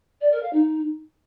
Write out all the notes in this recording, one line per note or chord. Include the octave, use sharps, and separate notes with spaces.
D5
A#4
F5
D#4